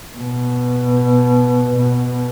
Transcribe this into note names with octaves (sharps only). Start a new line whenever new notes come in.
B2
B2